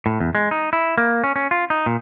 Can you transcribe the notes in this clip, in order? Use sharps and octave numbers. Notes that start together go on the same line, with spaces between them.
A2
E2
G#3
D#4
E4
A#3
C#4
C#4
F4
D#4
A#2